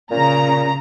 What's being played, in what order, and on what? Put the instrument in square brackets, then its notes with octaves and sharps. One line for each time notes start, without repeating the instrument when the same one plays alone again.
[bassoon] A#2 [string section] C#3 A#5